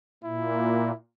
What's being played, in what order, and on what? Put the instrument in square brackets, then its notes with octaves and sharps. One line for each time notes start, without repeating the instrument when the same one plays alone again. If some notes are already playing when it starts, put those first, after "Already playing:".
[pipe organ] A#2 [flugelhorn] E4